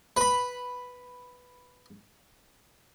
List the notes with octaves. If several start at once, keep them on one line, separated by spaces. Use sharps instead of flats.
B4 B5